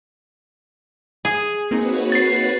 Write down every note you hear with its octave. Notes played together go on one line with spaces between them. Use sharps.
G#4
A#3 C4 D#4 F#4 B4 C#5
A6 C7